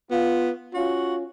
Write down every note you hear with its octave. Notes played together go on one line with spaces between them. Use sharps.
B3 F4
C#4 F4 F#4